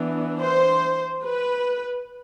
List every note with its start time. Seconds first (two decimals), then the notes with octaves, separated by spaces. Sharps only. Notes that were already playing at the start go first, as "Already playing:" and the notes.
Already playing: E3 B3 D4
0.40 C5
1.24 B4